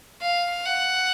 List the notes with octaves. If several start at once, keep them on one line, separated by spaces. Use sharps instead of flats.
F5
F#5